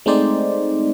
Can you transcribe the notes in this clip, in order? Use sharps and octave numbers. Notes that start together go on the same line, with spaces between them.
G#3 A3 C4 D#4 C5 D5